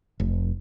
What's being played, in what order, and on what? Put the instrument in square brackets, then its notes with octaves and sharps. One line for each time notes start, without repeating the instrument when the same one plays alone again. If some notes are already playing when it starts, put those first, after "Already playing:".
[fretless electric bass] F1